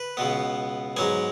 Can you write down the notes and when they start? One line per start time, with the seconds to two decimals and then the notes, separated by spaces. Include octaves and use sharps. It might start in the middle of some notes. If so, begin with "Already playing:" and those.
Already playing: B4
0.17 C#2 B2 B3
0.97 G#2 F#3 B3 G#5